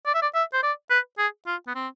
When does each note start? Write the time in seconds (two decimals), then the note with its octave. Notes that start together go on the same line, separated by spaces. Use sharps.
0.06 D5
0.15 E5
0.22 D5
0.35 E5
0.53 C5
0.63 D5
0.90 B4
1.18 G#4
1.47 F4
1.67 B3
1.75 C4